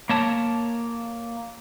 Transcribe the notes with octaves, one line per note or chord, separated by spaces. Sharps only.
A#3 C#5 A5